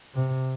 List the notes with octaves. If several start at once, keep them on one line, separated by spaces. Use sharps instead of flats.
C3